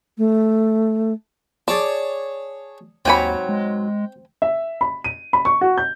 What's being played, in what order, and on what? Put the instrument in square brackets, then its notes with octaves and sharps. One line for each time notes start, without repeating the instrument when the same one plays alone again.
[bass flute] A3
[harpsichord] G#4 C#5 A5 [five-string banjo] D5
[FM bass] D#2 [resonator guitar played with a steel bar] G#2 F#3 C#5 [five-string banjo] C4 G#5 B5 [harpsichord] G5
[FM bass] G#3
[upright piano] E5
B5
D#7
B5
C#6
F#4
G6